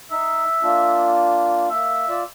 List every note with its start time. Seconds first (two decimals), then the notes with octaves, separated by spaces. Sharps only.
0.11 D#4 E5
0.63 A#3 D4 F4
1.70 A#3 E5
2.09 F4 D5 E6